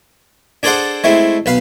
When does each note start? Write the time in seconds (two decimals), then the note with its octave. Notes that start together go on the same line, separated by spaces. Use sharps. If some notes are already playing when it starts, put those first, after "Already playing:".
0.63 D4 G#4 A4 C5 D5 F#5
1.04 G#3 A3 C4 E4
1.46 B1 B4 F5